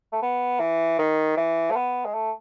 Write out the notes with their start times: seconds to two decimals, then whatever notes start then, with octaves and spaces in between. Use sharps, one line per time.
0.12 A3
0.23 B3
0.60 E3
0.99 D#3
1.37 E3
1.71 A3
1.76 B3
2.05 G#3
2.14 A3